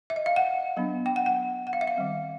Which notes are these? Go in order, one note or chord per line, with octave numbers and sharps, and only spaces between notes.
E5
D#5
F5
F#5
F#3 B3 D4
G5
F#5
F#5
F#5
F5
E5
F5
D#3 G3 C4